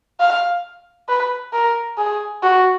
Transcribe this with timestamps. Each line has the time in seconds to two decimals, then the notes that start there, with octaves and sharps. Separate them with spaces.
0.20 F5
1.09 B4
1.53 A#4
1.98 G#4
2.43 F#4